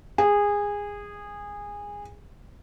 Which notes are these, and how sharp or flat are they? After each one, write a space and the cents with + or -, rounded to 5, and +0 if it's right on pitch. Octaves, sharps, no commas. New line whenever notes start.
G#4 -20